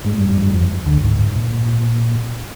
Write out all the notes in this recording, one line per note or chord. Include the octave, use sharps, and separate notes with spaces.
G#2 G#3
G2 G3
G2 G3
F3
G2 G3
F2 F3
D2 D3
G#2
G#2
A#2